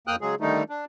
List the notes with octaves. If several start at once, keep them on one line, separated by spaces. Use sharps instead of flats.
F2 A#3 G5 D#6 F6 F#6
C#3 F#3 G#3 G#4
D3 D#3 G3 A3 D#4
D4